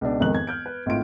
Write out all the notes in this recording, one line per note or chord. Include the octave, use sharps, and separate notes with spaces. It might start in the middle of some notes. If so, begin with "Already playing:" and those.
C#2 B2 D4
E1 F2 G#2 D#3 F#6 F#7
G#6
F6 G6 D7
B4
G#1 A2 F4 D7